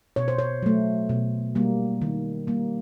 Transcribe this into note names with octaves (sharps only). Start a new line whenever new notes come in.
B2 C#5
C5
C#5
F#3 A3
B2
G3 A#3
D#3
G3 A#3